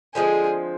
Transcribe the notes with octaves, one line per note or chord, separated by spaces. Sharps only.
D3 F3 G#3 C4 G#4